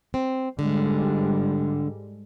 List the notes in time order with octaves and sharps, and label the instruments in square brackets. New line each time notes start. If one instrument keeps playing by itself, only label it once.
[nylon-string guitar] C4
[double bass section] G#2 G3 G#3 [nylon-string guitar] D3